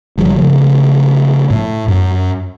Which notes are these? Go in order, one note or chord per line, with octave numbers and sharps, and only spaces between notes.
F#1 F3 G3
C#3 F3 A3
A2
F#2